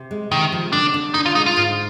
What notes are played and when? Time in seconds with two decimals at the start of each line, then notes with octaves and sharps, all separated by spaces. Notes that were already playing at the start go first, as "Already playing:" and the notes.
Already playing: C3
0.11 G#3
0.31 C3 D#3
0.52 F3
0.72 D3 D4
0.94 D4
1.14 D3 D#4
1.26 F4
1.35 G#3 D#4
1.46 F4
1.57 G#2